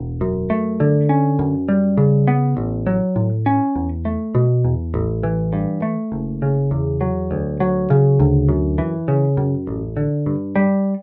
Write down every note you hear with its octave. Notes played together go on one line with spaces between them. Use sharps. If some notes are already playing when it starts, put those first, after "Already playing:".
Already playing: E1
F#2
A3
D3
C#4
F#2
G3
C#3
B3
A1
F#3
A2
C#4
E2
A3
B2
E2
A1
E3
G2
A3
F#1
C#3
E2
F#3
D2
F#3
C#3
D2
F#2
E3
C#3
F#2
A1
D3
G2
G3